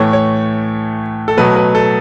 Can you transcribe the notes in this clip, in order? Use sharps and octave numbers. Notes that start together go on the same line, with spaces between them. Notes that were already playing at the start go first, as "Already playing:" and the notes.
Already playing: A2 E3 A3 C#5
C#5
A4
B2 F#3 A3 B4
B4
A4